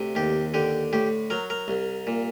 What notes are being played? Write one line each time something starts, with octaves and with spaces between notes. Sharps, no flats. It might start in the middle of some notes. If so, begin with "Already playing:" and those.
Already playing: D2 C3
D#2 G4
D3 G4
A2 G4
F#3 A#4
A#4
C2
A#2